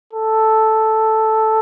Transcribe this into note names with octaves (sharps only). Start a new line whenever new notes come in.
A4